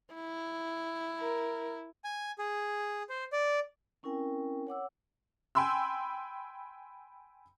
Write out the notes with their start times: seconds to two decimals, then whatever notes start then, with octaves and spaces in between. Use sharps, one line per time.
0.14 E4
1.20 A#4
2.04 G#5
2.39 G#4
3.09 C5
3.32 D5
4.03 C4 C#4 E4 A#4 G5 G#5
4.67 C#5 F#5 D6 E6
5.55 G5 G#5 B5 C6 E6